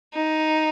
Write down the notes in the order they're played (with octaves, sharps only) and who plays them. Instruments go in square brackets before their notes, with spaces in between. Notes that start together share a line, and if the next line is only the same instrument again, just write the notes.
[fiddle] D#4